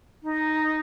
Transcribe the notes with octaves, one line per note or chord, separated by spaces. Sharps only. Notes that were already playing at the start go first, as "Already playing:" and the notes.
D#4